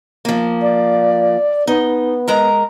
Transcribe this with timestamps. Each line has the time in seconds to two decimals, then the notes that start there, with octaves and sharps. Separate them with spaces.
0.25 F3 A#3
0.61 D5
1.67 B3 D#4
2.28 G#3 A#4 A#5